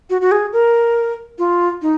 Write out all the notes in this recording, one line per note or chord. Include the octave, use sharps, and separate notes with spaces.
F#4
F#4
G#4
A#4
F4
D#4